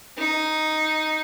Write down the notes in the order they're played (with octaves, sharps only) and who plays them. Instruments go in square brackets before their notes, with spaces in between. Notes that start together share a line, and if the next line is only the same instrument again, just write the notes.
[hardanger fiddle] D#4